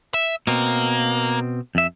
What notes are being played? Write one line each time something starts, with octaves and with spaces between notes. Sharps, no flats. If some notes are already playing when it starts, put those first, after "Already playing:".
E5
B2 A#3 C4
F2 E5